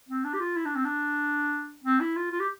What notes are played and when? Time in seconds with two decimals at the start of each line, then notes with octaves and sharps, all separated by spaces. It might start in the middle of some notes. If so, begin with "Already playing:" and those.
0.08 C4
0.24 D4
0.34 G4
0.40 F4
0.56 E4
0.65 D4
0.75 C4
0.85 D4
1.84 C4
2.00 E4
2.16 F4
2.31 F4
2.40 G4